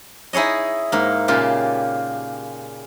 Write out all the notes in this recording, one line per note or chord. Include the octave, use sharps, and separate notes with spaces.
D#4 E4 G#4 C#5 D#5
G#2 A#3
A#2 C#3 F4 G4